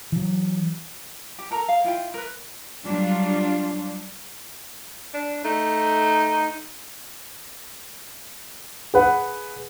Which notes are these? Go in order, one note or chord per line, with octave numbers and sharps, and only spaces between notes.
E3 F#3
G4
A4 A#4 A#5
F5
E4 F4 G5
A#4 B4
F#3 G3 D4 F4
D4
A3 D#4
G#4 B4 F#5